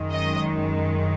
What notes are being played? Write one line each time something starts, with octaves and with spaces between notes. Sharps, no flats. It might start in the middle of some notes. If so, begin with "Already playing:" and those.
Already playing: F#2 D#3 G#3
D#5